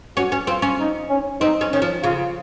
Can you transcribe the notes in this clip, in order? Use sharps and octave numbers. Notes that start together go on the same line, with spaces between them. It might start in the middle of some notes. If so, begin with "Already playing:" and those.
C#4 F#4
C#4
C4 F4
C#4
D#4
C#4
C4 D#4
C#4
D#3 C#4
F3
C#3 F4